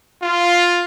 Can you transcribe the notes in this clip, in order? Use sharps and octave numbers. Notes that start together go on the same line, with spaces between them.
F4